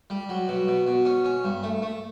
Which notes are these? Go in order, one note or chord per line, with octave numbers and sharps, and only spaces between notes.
G3
F#3
B2
B2
B2
C#4
C#4
G2
A3
A3